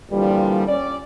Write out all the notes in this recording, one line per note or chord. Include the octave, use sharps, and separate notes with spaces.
A#2 D3 E3 F3 G3
C#4 D5